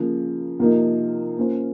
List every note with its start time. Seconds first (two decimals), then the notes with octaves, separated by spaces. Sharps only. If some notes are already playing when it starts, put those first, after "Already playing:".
Already playing: C#3 F3 A#3
0.59 C3 F3 A#3 D#4
1.37 A#3 C#4 F4 C5